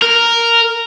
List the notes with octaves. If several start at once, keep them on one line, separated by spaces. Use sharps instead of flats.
A#4